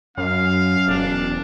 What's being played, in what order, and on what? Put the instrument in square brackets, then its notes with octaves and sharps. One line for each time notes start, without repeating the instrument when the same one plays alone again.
[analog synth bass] F#2 [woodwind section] F#3 C#4 [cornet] F5
[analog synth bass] E1 [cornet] D4